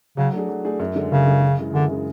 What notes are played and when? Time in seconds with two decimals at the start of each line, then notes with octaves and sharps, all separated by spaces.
0.17 C#3 F#3
0.33 A3 D4 G#4
0.49 F#3
0.64 A3 D4 G#4
0.79 F#2
0.96 D3 G#3
1.11 F#2 C#3
1.27 D3 G#3
1.42 F#2
1.59 C#3 E3 G#3
1.73 F#2 D3
1.89 C#3 E3 G#3